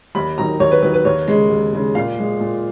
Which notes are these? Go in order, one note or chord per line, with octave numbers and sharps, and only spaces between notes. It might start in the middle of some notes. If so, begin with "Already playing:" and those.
D#2 B5
D#3 F#3 A#5
D#2 C#5
B4
D#3 F#3 B4
B4
D#2 C#5
C#3 G#3
D#2
C#3 G#3
A#2 F5
F3 G#3
A#2